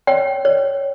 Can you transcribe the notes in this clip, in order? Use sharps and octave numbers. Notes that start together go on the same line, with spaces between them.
C#5 G5
C#5